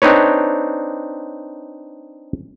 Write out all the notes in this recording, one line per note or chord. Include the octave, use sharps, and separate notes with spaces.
C4 D4 D#4 B4 C#5